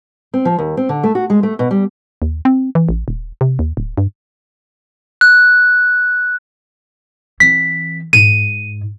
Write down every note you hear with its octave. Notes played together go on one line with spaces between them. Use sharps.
C4
F3
D#2
C4
D3
A3
F#4
G#3
A3
B2
G3
D#2
C4
E3
A1
D#1
C3
D#2
D1
G2
F#6
E3 C4 B6
G#2 D#7